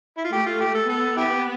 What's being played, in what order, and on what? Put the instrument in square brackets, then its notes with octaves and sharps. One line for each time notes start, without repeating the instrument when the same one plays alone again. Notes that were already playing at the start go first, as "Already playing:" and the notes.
[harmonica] E4
F4
[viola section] A3 [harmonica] G4
[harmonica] F4
G4
A4
[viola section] B3 [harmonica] A4
[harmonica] E4 G4